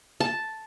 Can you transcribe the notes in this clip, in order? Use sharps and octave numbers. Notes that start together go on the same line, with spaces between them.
A5